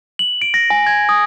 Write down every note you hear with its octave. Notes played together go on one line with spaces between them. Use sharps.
F#7
D7
A#6
G#5
G#6
D#6